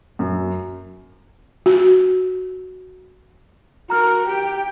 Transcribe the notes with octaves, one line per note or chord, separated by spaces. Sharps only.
F#2
F#4
F#4 A#4 A#5 F6
G4 G5